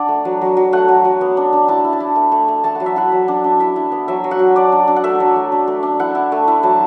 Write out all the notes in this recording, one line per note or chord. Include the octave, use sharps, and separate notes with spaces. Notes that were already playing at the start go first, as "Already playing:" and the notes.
Already playing: D4 D5 F#5
A3
F#3
F#3
F#3
A3 F#5
F#3
F#3
B3
D4
D4
E4 A5
E4
A5
E4
A3
A3
A3
A3 A5
F#5
F#3
E5
E4 F#5
F#3
D4
D4
E4 E5
E4
B3
F#3 E5
F#3
F#5
F#3
D4 D5
D4
D4
F#5
A3 E5
F#3
A3
D4
A3
D4
E4 F#5
E4
A3
E4
F#3 A5